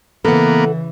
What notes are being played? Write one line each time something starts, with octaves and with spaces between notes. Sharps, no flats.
C#3 E3 A#3 B3 A4 F#5